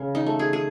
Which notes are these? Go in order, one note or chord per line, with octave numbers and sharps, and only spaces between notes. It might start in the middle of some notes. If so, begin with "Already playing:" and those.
Already playing: C#3
D#4
A3
G#4
G#4